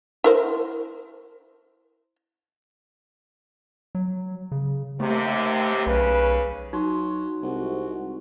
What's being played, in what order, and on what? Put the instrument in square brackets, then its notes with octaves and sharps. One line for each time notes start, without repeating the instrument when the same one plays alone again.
[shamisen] E4 A#4 C5
[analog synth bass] F#3
C#3
[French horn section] D#2 C3 [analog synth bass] A3
[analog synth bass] B1 [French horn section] C#3 B4
[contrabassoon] F#3 [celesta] D#4 C6
[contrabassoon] C2 [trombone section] C3 G#3 F#4